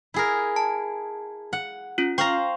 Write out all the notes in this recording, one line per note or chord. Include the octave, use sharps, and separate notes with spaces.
E4 G#4 A#4
A5
F#5
C#4 F4
C5 F5 G5 A#5 C#6